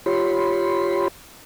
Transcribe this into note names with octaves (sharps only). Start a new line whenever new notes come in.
F4 G4 C#5 B5 C6